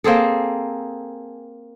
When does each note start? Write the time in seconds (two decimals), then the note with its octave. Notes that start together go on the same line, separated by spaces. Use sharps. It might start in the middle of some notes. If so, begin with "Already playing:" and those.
0.04 A#3 C4 G#4 A4